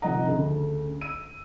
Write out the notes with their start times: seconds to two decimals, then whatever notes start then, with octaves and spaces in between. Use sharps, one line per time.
0.02 C3 D#3 F3 D#5 F#5 A#5
0.26 D2 C#3 A3
1.01 E6 D#7